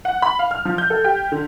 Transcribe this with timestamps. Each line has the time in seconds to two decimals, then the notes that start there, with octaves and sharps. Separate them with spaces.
0.05 F#5
0.22 B5
0.39 F5
0.51 F6
0.65 F3
0.78 G6
0.90 A4
1.04 G4
1.32 D3